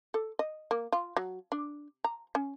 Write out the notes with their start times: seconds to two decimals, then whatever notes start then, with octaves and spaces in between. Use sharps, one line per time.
0.14 A4
0.39 D#5
0.71 A#3
0.92 F4
1.17 F#3
1.52 D4
2.04 A#5
2.35 C#4